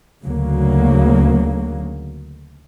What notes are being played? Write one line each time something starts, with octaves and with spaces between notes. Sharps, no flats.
D2 C#3 F#3 A#3